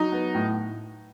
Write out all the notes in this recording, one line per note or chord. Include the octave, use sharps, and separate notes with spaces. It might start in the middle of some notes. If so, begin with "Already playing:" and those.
Already playing: F#3 D#4
B3
A2